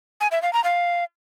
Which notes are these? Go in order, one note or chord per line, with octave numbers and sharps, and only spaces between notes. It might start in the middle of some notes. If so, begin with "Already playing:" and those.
G#5
E5
F5
A#5
F5